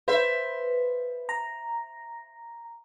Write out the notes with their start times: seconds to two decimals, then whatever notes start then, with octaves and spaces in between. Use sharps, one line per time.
0.08 B4 C5 E5
1.29 A#5